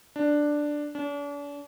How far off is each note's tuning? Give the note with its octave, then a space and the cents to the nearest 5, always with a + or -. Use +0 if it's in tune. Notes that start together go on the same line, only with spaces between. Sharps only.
D4 +5
D4 -40